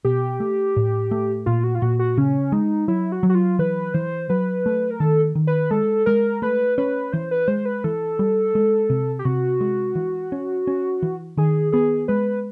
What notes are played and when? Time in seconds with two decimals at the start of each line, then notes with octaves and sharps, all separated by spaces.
0.05 B2 G4
0.40 A3
0.76 A2
1.11 A3
1.46 A#2 F4
1.64 F#4
1.75 F4
1.82 A#2 F#4
1.99 F#4
2.17 C#3 C#4
2.52 G#3 D#4
2.88 F#3 E4
3.12 F#4
3.23 F#3
3.30 F#4
3.35 F4
3.59 E3 B4
3.94 E3 C5
4.29 F#3 B4
4.66 A3
4.91 A#4
5.00 D#3 A4
5.35 D#3
5.47 B4
5.71 G#3 A4
6.06 G#3 A#4
6.42 A3 B4
6.78 C#4 B4
7.13 E3 C5
7.31 B4
7.48 G#3 C5
7.65 B4
7.84 E3 A4
8.19 G3
8.55 G#3
8.90 C3
9.19 G4
9.25 C3 F#4
9.61 G#3
9.95 E3
10.32 C#4
10.67 C#4
11.02 E3
11.37 D#3 G#4
11.72 B3 G#4
12.08 G#3 B4